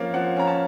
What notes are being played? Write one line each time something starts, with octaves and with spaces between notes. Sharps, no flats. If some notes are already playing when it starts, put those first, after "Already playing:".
Already playing: F3 A#3 C#4 F5
F3 F#5
C#4 A#5
A5